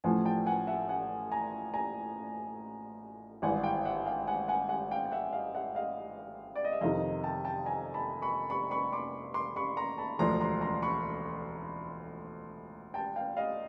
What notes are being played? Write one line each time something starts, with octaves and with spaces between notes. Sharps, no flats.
A1 A2 F3 F#5 G#5
G5 A5
F#5 G#5
E5 F#5
F#5 G#5
G#5 A#5
G#5 A#5
G#1 G2 E3 G3 F#5 G#5
F5 G5
E5 F#5
F5 G5
F#5 G#5
F#5 G#5
F#5 G#5
F5 G5
G5
E5 F#5
D#5 F5
E5 F#5
D#5 F5
D5
D#5
E5
F2 C3 D#3 D#5 F5
G5 A5
G5 A5
G#5 A#5
A5 B5
B5 C#6
B5 C#6
B5 C#6
C6 D6
C6 D6
B5 C#6
A#5 C6
A5 B5
E1 D2 D3 F3 A#5 C6
A#5 C6
A#5 C6
B5 C#6
G5 A5
F5 G5
D#5 F5